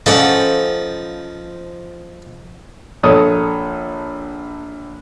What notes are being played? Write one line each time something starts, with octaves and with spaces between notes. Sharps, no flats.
F3 C#4 D#4 A4 D5 F#5 A5 B5
A#1 A4 C#5 D#6